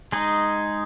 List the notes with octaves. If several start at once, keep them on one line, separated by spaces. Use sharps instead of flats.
G#3 D#4 G#4